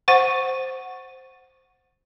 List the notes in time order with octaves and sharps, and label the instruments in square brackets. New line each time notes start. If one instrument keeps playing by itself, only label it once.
[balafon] C5 F#5 C#6